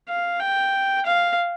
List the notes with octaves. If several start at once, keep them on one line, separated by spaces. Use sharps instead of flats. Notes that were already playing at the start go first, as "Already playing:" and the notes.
F5
G5
F5